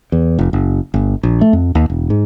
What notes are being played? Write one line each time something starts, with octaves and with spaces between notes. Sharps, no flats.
E2
F1
F#1
G1
A#1
A3
F2
D#2
E1
G#2